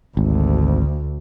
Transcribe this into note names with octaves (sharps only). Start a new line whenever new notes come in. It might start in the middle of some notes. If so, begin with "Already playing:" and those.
G#1 D2